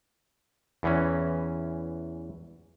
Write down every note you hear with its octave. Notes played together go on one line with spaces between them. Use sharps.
E2 E3 C#4